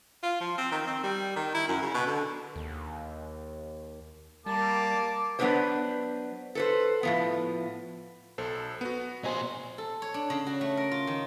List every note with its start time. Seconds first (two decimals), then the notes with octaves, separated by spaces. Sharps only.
0.23 F4
0.41 F3
0.58 C4
0.72 D#3
0.87 C4
1.04 G3
1.36 D#3
1.54 E4
1.68 F#2
1.82 C#3
1.94 B2
2.07 D3
2.56 D#2
4.46 G3 A#3 A5 D6
5.39 F#3 B3 C4 D4 B4 C5
6.55 A4 B4 C5
7.03 A2 F3 B3
8.38 B1 A4 C5
8.81 B3 F#4
9.24 A#2 C5 D#5 G#5
9.78 A4
10.02 C#5
10.14 D4
10.30 C#3
10.47 F#4
10.61 A3
10.77 A#4
10.91 F4
11.07 D#3